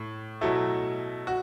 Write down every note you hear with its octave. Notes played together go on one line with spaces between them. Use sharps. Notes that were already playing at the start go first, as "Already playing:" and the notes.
Already playing: A2
B2 F#3 A3 E4
F#4